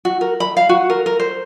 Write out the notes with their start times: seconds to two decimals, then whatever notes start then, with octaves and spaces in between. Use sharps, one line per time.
0.05 F#4
0.21 A#4
0.40 B5
0.57 F5
0.69 F#4
0.90 A#4
1.06 A#4
1.20 C5